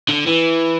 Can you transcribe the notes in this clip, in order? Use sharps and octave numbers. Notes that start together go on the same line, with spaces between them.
D3
E3